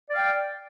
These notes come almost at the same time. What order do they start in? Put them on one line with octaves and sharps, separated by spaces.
D5 F5 G5